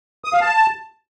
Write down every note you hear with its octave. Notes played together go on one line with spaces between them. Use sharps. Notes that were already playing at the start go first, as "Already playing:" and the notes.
D#6
F5
A5